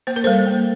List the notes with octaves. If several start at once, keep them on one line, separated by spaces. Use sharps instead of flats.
A#3 C5
A#4
G3 A4 C5
A#3